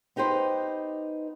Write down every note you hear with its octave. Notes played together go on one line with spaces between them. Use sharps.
B3 D#4 G4 B4 C5